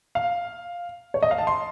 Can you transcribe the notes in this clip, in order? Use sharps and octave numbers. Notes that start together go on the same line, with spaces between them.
F5
C#5
D#5
F5
A5
C6